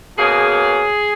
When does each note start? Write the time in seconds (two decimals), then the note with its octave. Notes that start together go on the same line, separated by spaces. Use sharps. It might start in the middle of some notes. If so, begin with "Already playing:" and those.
0.18 B2 A#3 C#4 G#4